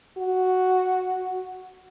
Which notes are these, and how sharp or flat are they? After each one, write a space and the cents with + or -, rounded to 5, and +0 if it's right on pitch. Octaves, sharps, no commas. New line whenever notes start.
F#4 +0